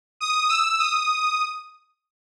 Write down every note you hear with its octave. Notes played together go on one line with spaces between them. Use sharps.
D#6
E6
D#6